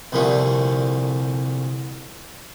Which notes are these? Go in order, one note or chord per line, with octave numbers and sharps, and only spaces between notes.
C2 F2 A#2 D3 A3